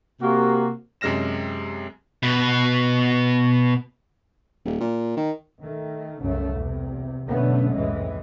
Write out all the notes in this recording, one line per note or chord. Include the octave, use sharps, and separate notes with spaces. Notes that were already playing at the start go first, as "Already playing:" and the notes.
C3 A#3 F#4
F#2 C3 G#3 F6 A#6 E7
B2 B4
D#1
A#2
D#3
D#3 A3
C2 F#2 C#3 A3
E2 C3
F#2 B2 D3 A3 B3 C#4
C2 F2 A2 E3 G#3